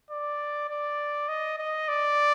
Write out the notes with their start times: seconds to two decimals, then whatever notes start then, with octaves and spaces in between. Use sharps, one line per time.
0.11 D5
0.69 D5
1.29 D#5
1.58 D#5
1.89 D5